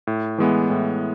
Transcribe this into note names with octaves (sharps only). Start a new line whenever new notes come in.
A2
E3 G#3 B3
A2